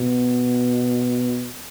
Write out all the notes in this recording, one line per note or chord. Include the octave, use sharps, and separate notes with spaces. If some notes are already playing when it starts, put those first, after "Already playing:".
Already playing: B2